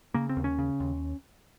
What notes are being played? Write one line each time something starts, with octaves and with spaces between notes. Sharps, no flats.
C#3 A#3
C4
D#2
C#4
C#3
D#2